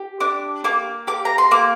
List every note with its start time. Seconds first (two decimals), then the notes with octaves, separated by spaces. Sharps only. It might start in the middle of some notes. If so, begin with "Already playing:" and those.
Already playing: G4
0.20 D4 D6
0.64 A#3 D6
1.07 G4 D6
1.25 A#5
1.38 C6
1.51 A#3 D6